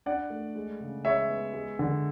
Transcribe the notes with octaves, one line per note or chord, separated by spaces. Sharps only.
D4 D5 F#5
A3
G#3
C#3
G#3 C#5 E5
B3
G#3
D3